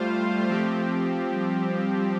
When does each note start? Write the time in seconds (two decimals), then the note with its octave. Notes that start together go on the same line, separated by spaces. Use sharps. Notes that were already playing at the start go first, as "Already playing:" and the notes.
Already playing: G3 A3 F4 C5 F5
0.49 F3 C4 G4
1.27 G3